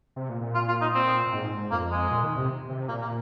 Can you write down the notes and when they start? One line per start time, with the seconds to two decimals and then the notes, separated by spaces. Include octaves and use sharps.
0.16 C3
0.29 A#2
0.41 A#2
0.55 F4
0.68 F4
0.81 D#4
0.94 C4
1.27 A#2
1.33 G#2
1.71 F2 A#3
1.91 G#3
2.11 A#2
2.23 D#3
2.37 C3
2.69 C3
2.89 A#2 A#3
3.02 A#3